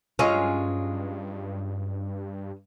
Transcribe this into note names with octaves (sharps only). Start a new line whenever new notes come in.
G2 F#3 G#3 C#4 F4